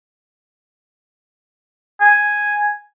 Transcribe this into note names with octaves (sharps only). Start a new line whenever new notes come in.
G#5